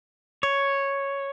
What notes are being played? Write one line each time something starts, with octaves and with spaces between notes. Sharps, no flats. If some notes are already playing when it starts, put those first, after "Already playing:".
C#5